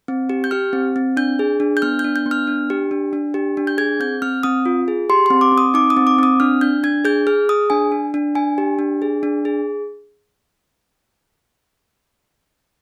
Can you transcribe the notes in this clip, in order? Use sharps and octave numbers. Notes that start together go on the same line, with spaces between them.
C4
G4
G6
G4 F6
C4
C4
D4 G6
G#4
D4
G6
B3 F6
G6
D4
G6
B3
F6
D4
G4
D4
D4
G4
D4
G6
G#4 G#6
C4 G6
C4 F6
C4 D#6
F4
G#4
G4 C6
C6
C4
D6
C4
D#6
D#4 D6
D#6
C4
D6
C4 D#6
D4 F6
D4 G6
D4 G#6
G#4 G6
G#4 F6
G#4 D#6
D4 G#5
D4
D4
D4 G#5
G4
D4
G#4
D4
G#4